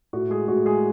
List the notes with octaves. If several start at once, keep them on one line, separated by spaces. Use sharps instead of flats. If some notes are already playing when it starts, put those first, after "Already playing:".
A2 F#4
G#3 G#4
A2 F#4
G#3 G#4